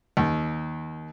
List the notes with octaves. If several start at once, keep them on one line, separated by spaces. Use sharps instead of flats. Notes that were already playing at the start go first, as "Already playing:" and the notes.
D#2